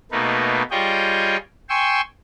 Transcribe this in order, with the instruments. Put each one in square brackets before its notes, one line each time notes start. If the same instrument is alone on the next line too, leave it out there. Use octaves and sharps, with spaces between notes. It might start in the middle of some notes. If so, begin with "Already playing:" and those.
[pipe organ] B2 A3 A#3 D#4 B4
G3 F4 G#4 C#5 D#5 G5
G5 G#5 C6 C#6 E6